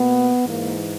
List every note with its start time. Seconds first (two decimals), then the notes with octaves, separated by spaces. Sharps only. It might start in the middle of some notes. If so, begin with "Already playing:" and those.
Already playing: B2 A#3 B3
0.44 G#2 E3 A#3